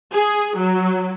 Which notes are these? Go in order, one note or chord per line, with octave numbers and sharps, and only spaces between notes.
G#4
F#3